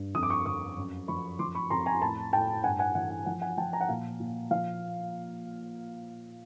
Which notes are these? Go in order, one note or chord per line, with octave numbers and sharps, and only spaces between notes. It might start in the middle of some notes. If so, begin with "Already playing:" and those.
Already playing: G2
F2 D#6
D6
C#6 D#6
F2 C#6 D#6
F#2
F3 B5 C#6
F3 C6 D6
B5 C#6
F2 A#5 C6
G#5 A#5
A2 A5 B5
A2 G5 A5
G2 F#5 G#5
F#5 G#5
E3 F#5
F#5
F3 F#5
F#5 G#5
F3 G5 A5
G#5 A#5
F#5
A#2 F5
A#2
F3 F5